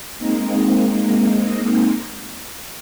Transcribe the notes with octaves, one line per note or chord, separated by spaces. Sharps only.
G#3 A#3 C4 D#4